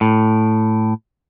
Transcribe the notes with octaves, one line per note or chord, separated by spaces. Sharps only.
A2